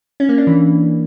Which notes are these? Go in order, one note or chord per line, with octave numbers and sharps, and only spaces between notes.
C#4
A#3
D4
E3